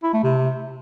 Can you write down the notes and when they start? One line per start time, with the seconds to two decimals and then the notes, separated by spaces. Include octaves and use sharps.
0.03 E4
0.13 A3
0.24 C3